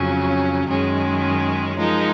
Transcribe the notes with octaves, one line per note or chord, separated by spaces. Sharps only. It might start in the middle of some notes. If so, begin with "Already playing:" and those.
Already playing: F2 C#3 F#3 C#4
F#2 D#3 G#3 C#4 G#4
F3 G#3 D#4 A#4